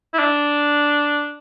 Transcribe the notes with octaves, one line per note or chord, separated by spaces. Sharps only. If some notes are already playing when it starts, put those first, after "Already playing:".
E4
D4